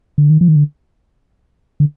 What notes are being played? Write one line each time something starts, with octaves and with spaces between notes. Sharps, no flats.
D3
D#3
F3
D#3
D3
D3